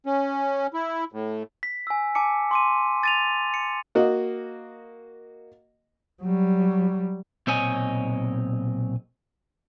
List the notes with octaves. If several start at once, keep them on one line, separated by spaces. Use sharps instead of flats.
C#4
E4
A2
B6
G#5 E6
G#5 A5 D6 C#7
C6 D6 D#7
A6 D#7 F7
C#7
A#3 F#4 D#5
F#3 G3
B1 A#2 C4 C#5 D#5 G#5